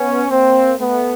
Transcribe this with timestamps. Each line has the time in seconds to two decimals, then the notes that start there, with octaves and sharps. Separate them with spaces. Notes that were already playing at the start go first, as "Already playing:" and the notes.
Already playing: B3 C#4
0.30 A#3 C4
0.79 A3 B3